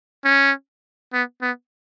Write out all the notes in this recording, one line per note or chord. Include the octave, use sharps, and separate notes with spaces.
C#4
B3
B3